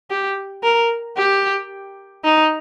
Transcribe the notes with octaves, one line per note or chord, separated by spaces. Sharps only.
G4
A#4
G4
D#4